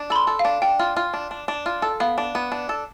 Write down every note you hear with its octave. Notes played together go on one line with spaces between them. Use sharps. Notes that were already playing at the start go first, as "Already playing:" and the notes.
Already playing: D4
A4 B5
C6
A4
F5
D4
D4 G5
F4
F4
D4
D4
D4
F4
A4
B3 F5
D4
B3
D4
A4